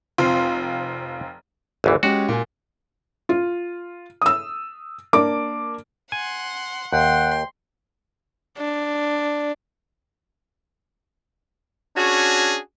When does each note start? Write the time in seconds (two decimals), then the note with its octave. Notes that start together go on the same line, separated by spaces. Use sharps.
0.18 F1 C4 F4 F5
1.84 G#1 D2 E3
2.03 G#3 C#4 F#4 G4
2.29 A#2 G#5
3.29 F4
4.22 D#6 E6
5.13 A#3 D4 D6
6.12 F#5 G#5 C6
6.93 D#2 F#5 G5 C6
8.58 D4
11.96 C#4 D4 F#4 G#4